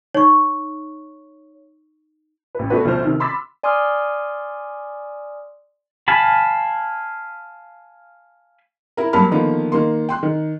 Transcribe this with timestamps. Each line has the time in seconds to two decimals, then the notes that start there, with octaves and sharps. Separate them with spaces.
0.15 D#4 C#5 C#6
2.55 A1 B4
2.70 A3 B3 D4 F#4 B4
2.85 D2 B2 F3 D4 C5 F6
3.05 C3 D#3
3.20 B5 C6 D6 E6 A6 B6
3.63 D5 G#5 C6 D6 D#6 F6
6.08 F5 G#5 A5 B5
8.97 E4 A#4
9.13 G2 F#3 A#3 A5 B5 F6
9.31 D3 D#3 F3 A#3 B3
9.72 D#3 A#3 C6
10.09 G5 C6 F#6
10.23 D#3